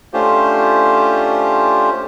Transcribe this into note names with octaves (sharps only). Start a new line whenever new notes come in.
A3 C#4 D4 F4 G4 C5